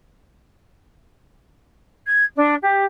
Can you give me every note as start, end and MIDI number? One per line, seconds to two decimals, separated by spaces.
2.06 2.25 92
2.35 2.54 62
2.63 2.84 67